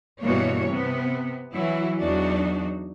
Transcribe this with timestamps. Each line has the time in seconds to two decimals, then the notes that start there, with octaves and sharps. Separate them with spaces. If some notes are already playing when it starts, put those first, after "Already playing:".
0.21 G2 B2 E3 G3 A#3 C#5
0.69 C3 B3
1.52 E3 F#3 E4
1.99 E2 F#3 D4 D#4 F#4